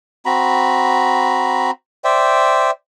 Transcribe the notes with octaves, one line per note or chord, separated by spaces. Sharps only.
C4 F#4 A#5 B5
C5 D5 E5 G5